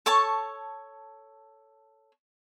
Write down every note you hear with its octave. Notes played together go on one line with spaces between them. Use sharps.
A4 C#5 A5 C#6